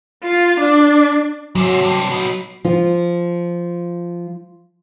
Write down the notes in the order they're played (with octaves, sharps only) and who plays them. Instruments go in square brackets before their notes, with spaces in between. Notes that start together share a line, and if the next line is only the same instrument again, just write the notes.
[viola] F4
D4
[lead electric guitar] G#2 C3 [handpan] F#3
[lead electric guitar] G2 C3
B3 D#4
[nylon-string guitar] F3 F4